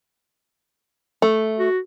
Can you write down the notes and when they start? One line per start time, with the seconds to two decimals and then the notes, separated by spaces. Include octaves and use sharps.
1.22 A3
1.58 F#4